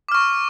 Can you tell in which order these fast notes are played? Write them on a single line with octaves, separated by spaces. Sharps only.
D6 F6 C#6